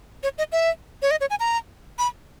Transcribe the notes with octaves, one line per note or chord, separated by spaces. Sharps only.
C#5
D#5
E5
C#5
D#5
C#5
G#5
A#5
B5